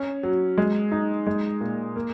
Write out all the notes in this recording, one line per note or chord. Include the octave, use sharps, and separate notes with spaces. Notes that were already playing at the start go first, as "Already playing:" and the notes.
Already playing: C#4
F#3
G#3
D#4
G#3
A#2
A#3